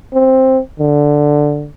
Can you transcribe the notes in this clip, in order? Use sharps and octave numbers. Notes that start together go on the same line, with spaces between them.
C4
D3